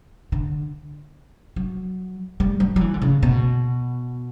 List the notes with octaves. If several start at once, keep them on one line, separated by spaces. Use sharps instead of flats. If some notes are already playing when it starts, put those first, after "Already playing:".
D3
F#3
G3
F#3
F#3
E3
D3
C#3
B2